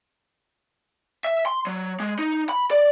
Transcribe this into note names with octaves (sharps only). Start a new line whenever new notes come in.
E5
C6
F#3
G#3
D#4
B5
D5